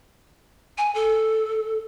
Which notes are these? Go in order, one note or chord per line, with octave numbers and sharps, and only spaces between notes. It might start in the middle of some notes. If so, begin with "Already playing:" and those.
G#5
A4